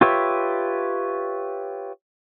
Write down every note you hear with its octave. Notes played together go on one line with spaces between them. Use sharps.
F4 G4 B4 C#5 E5